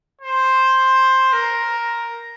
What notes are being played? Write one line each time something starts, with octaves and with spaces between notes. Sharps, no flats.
C5
A#4